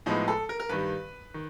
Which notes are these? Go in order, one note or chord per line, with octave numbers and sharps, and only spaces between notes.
A2 F3 G#3 B3 D#4
A4
A#4
A#4
G2 D#3 G3 B4
D#3